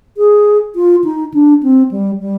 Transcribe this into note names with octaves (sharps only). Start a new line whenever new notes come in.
G#4
F4
D#4
D4
C4
G3
G3